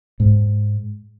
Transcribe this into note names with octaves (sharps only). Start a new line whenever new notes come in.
G#2